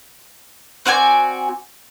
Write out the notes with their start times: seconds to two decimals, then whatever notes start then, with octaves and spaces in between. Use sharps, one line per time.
0.86 C4 F#4 D5 G#5